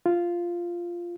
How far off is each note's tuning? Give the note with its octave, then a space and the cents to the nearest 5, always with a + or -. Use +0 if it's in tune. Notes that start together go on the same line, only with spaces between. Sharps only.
F4 -10